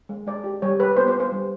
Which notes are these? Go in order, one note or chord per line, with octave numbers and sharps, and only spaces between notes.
G#3
G#3 D5
G4
G3 C#5
G4 B4
B3 C5
C5
B3
C5
G3